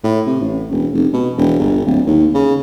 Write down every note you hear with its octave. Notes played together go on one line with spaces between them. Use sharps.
A2
C3
A1
E1
F1
B2
E1
G1
D1
D#2
C#3